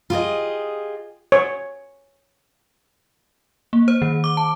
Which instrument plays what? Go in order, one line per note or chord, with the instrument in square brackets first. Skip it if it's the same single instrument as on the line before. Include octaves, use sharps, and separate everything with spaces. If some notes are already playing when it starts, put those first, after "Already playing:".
[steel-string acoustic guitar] F4 G4 G#4 D#5
[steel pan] C#5
[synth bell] A#3
C5
D#3
D6
A5